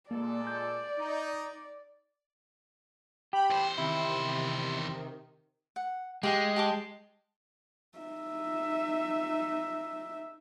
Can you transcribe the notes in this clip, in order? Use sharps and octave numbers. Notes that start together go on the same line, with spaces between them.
A#2 G#3 A#3 A4 D5
G6
D#4
G4 B5 G6
E2 C5
C3 D#3 E4
F#5
G#3 G4 F5 G#5
G4 A5 D6
D#4 E5